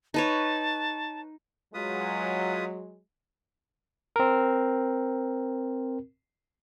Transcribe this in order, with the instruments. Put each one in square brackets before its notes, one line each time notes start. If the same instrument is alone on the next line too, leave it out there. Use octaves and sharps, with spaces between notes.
[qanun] D#4 B4 C#5 [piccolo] A5
[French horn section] F#3 G#3 [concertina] F4 B4 D#6
[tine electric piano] C4 A#4